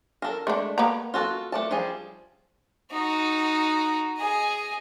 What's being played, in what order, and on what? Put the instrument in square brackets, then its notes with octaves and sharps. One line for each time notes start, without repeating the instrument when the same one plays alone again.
[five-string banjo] A4 A#4
[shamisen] G#3 D4 [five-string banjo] A3
[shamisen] A#3 B3 A#5
[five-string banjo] F4 F#4 A4
A3 D5 A5
F3 G3 G#4
[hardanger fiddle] D#4 F#4
G#4 D#5